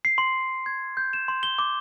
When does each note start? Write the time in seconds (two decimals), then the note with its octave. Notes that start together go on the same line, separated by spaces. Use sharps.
0.05 C7
0.18 C6
0.66 G#6
0.97 G6
1.13 E7
1.28 C6
1.43 G7
1.59 D6